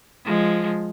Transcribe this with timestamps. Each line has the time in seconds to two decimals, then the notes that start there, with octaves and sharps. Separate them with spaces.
0.25 F3 G#3